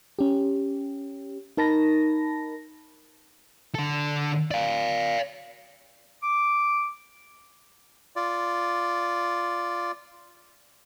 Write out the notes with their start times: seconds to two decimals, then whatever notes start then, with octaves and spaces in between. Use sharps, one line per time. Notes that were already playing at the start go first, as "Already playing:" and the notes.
0.19 C#4 G4
1.57 D#4 A#4 A5 B5 A#6
3.75 D3 A4
4.51 D5 F5
6.22 D6
8.16 F4 D5